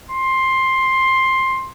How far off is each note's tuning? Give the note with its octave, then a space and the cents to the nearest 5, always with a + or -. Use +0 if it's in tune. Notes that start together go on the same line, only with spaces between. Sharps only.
C6 +10